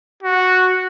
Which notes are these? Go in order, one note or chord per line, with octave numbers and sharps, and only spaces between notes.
F#4